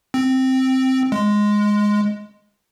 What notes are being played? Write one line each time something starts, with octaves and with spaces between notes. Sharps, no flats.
C4
G#3